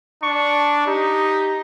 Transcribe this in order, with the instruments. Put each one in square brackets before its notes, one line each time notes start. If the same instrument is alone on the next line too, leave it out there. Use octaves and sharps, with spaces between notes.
[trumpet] D4 [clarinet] C#6
[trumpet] D#4 [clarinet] G4